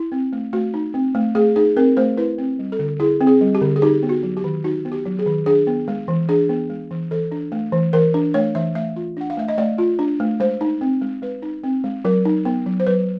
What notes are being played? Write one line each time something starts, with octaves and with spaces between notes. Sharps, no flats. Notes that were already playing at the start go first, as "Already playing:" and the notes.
Already playing: E4
C4
A3
A3 F#4
D#4
C4
A3
A3 G#4
D#4 G#4
C4 A#4
A3 C5
E4 B4
C4
G3
A4
D3
E4 G#4
C4
G#4
G3
G4
D3
G#4
D#4 G4
B3
F#4
F#3
G4
D#3
D#4 F#4
B3
G4
F#3
G#4
D#3
D4 G#4
B3
G#3
E3
D4 G#4
B3
G#3
E3
E3 A4
D4
A3
E3
E3 A#4
D4
A3 C#5
E3 E5
A3 E5
F4
D4 F#5
F5
A3 E5
D#5
A3 D5
F4
D4
A3
G#3 C5
D#4
C4
G#3
G#3 B4
D#4
C4
G#3
F#3 A#4
D#4
B3
F#3
C5
F#3 B4